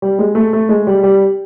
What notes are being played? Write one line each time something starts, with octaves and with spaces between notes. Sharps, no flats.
G3
G#3
A3
A3
G#3
G3
G3